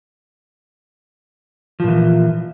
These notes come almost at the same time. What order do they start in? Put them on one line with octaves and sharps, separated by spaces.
F3 A#2 E3